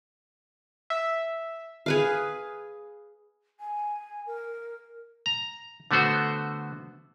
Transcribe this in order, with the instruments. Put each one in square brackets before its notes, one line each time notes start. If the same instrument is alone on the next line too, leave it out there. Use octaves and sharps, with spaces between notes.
[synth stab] E5
[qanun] G#4 B4 F5
[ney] G#5
A#4
[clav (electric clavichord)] A#5
D3 A3 B3 F#4 C5